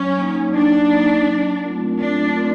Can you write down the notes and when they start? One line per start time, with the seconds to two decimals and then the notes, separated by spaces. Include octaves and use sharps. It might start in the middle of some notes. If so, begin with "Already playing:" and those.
Already playing: F#3 C#4
0.17 A#3 D#4
0.54 F#3 D4
0.91 A#3 D#4
1.27 F#3
1.64 A3 C4 F4 A#4
2.00 F#3 D4
2.36 A3 C4 F4 A#4